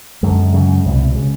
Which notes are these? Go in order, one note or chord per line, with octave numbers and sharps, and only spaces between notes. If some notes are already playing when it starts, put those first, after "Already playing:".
F#2 D3 G#3
F#2 C#3
C2 B2
C#3